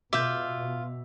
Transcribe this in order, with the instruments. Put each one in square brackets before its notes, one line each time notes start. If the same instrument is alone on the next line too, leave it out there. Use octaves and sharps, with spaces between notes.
[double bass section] B2 [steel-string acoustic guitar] F4 [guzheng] E5 [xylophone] D6 G6